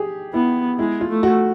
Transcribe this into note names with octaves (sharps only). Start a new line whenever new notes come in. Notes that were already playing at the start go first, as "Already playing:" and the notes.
Already playing: G4 G#4
B3 E4
G#3 E4
F4
A3
F#4